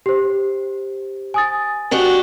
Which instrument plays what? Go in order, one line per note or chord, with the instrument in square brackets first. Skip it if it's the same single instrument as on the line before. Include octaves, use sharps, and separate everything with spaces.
[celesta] G4 C5
G#5 D#6 A6
[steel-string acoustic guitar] D4 F#4 G4